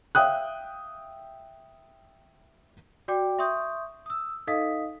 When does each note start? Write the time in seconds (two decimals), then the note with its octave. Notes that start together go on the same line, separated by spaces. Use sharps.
0.15 E5 F5 G5 D#6 F#6
3.08 F#4 D5 G5 D6
3.39 E5 C6 C#6 D#6 G6
4.06 D#6 E6
4.47 D#4 A4 D#5 F5 D#6 B6